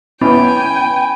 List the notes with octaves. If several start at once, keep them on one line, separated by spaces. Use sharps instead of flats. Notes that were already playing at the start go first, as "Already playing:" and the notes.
B3 C#4 E4 G5 G#5 B5